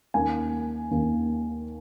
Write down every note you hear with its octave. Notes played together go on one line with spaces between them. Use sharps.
D#2 D#3 A#3 C#4 G#5
D#2 D#3 A#3 C#4